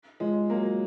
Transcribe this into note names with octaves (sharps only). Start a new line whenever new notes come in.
F3 G#3
F#3 A#3